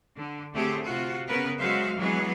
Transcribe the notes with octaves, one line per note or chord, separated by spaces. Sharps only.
D3
A2 D3 A3 C4 G4 G#4
C3 F4 F#4
C#3 B3 C#4 A#4 B4
F#3 G#3 F#4 C5 E5 F5
E3 F#3 G#3 B3 G#4